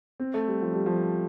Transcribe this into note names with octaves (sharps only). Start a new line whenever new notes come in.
C4
A3
G3
F3
G3
F3